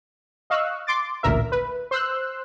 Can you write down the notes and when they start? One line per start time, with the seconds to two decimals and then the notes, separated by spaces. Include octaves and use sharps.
0.50 D#5 F5 C#6 E6 F#6
0.87 C6 D6 A6
1.23 A1 D2 A#2 A#4 E5
1.52 B4
1.91 C5 C6 E6 F#6